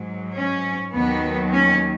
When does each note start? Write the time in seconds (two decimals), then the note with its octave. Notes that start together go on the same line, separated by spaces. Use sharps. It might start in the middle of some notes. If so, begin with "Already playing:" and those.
Already playing: G#2 F#3
0.35 C#4
0.93 D#2 D#3 F#3 B3
1.52 C#4